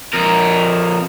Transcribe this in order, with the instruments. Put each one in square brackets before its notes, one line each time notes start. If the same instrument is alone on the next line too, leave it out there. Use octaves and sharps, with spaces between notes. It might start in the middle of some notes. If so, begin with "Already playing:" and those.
[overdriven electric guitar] F2 A#4